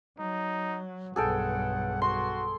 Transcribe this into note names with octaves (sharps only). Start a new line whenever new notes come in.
F#3 D#4
B1 G2 G#4 A4 F#5 G5
F#4 C6